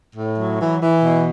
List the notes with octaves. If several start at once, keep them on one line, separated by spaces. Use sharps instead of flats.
A2
F#3
E3
E3
B2